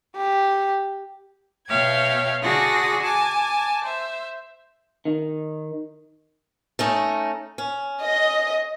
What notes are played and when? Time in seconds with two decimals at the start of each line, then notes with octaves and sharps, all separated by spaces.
0.16 G4
1.68 B2 C#5 E5 F5 G5 G#6
2.43 D3 F#4 G#4 D5 D#6 A#6
3.03 G#5 A5 D6
3.85 C5 E5
5.05 D#3
6.79 A3 C#4 D#4
7.58 C#4
8.02 D#5